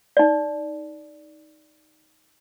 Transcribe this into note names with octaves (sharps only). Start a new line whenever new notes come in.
D#4 D5